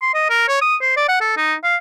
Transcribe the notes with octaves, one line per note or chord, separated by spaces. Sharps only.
C6
D#5
A#4
C#5
D#6
C5
D5
F#5
A4
D#4
F5